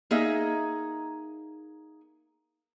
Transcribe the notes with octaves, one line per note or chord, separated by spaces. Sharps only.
A#3 D#4 G#4 D#5 E5